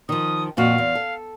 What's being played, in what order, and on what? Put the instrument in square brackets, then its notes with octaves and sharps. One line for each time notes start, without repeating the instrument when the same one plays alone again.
[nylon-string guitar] D#3 F3 [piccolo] D#6
[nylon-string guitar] F2 A#2 F#4 [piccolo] F5
[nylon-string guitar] E2
A4